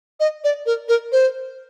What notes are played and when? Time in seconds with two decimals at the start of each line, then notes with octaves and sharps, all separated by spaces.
0.20 D#5
0.44 D5
0.66 A#4
0.89 A#4
1.12 C5